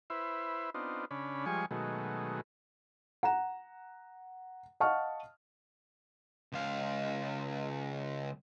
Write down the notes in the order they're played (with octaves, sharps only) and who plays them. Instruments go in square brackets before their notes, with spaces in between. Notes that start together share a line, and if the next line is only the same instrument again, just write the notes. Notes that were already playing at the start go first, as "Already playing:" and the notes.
[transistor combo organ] E4 B4 C5 E5
B3 C4 D4 D#4 F4
C#3 C#4 D4 B5
F3 G3 G#3 G#5 C#6
B2 D#3 F#3 G#3 A3
[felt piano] F#5 A#5 E7
D#5 F5 F#5 A5 C#6 F6
[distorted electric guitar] C#2 F5